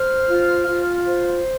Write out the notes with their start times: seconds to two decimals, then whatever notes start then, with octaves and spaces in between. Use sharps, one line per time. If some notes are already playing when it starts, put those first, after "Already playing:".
Already playing: C5 F6
0.28 F4
0.67 F4
1.06 C5